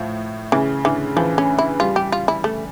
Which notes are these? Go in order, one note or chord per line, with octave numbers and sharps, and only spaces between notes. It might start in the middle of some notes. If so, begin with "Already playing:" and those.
Already playing: A2 F3
C#3 E3
D3 E3
E3 F3
C#4
E4
G3 F4
G4
F4
E4
A3